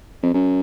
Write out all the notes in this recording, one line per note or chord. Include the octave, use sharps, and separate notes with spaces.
F2
F#2